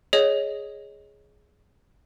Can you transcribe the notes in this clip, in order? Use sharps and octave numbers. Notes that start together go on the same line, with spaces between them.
G#4 C#5 D#5